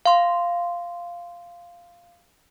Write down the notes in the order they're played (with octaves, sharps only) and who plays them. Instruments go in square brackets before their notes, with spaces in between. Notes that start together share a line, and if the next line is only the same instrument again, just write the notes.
[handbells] F5 C6